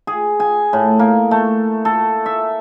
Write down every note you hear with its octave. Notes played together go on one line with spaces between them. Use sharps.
G#4
G#5
A2
A#3
A3
A4
E5